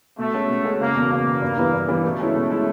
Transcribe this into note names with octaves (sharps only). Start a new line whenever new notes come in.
B2 A3
G#3 C#4 F#4 A4
B2
G#3 C#4 F#4 A4
F#1 A#3
E2 B2
F#1 A#3
E2 B2
G2
E3 G3 B3 E4
G2
E3 G3 B3 E4
B2 A3
G#3 C#4 E4
B2
G#3 C#4 E4